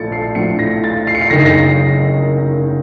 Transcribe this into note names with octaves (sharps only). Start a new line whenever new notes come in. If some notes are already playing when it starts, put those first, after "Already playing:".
Already playing: A#1 A2 F3 A6 C#7
C7
A#1 A2 F3 C#7
A#6
A6
C7
C#7
C7
F#1 F#2 D#3 A#6
C7
A#6